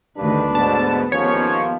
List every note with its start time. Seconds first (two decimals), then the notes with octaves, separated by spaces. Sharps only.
0.17 D2 G2 D#3 D4 B4
0.55 G#2 B2 D3 B3 A5
1.12 D#2 G#2 F3 C#4 C#5